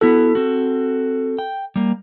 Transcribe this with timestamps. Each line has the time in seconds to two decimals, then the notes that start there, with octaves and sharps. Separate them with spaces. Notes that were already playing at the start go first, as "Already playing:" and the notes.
0.01 B3 E4 F#4 A4
0.35 C4 F#4
1.39 G5
1.76 G3 A#3